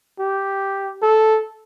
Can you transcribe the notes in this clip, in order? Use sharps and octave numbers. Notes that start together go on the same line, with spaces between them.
G4
A4